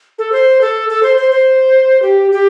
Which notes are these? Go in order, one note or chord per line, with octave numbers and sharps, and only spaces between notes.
A4
C5
A4
A4
C5
C5
C5
G4
G4